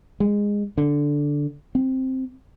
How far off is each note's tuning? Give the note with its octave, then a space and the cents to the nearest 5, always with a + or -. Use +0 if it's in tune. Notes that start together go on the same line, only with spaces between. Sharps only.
G#3 -15
D3 -5
C4 +0